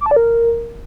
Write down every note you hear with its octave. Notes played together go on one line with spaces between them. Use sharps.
D6
A5
D5
A#4